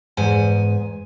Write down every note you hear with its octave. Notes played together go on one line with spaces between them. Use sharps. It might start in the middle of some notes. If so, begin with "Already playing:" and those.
E2 G#2 G#5